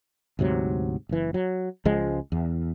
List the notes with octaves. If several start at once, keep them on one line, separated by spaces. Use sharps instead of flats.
D2 G#2 C3 F#3
F#1 E3
F#3
C#2 F3 G#3
E2